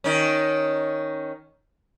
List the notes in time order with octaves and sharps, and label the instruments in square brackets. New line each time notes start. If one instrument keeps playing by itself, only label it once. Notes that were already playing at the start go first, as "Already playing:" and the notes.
[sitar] D#3 C#4